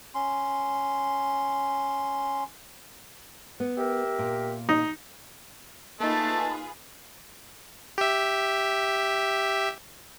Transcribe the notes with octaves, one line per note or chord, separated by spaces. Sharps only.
C#4 C6
B3
G4 A#4 E5
A#2
D#4
A3 A#3 D#4 F4 G#4 B4 A5
G4 E5